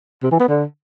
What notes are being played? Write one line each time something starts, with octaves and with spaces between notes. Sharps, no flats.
C3
E3
B3
D3